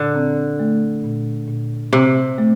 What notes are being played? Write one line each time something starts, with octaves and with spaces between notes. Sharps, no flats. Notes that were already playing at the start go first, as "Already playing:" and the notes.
Already playing: A#2 D3
C4
A3
A#2
A#2
C3 C4
A3